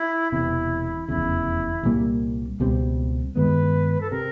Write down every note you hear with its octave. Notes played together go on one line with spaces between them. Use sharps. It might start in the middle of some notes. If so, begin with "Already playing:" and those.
Already playing: E4
E1 E2 C3 E4
F1 E2 C#3 E4
C2 A#2 G3 A#3
C#2 B2 G3 C4
G2 D#3 G#3 B3 B4
A4
C3 A#4